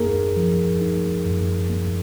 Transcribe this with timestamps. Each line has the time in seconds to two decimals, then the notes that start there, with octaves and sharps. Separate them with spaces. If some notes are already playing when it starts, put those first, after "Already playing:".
Already playing: F#2 A#3 D#4 G#4 A#4
0.36 F3
0.81 D#4
1.26 F#2
1.70 A#3